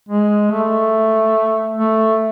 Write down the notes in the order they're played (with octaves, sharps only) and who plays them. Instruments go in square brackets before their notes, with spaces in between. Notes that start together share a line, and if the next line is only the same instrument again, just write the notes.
[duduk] G#3
A3
A3